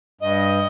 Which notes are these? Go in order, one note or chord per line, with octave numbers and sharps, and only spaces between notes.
G2 D#5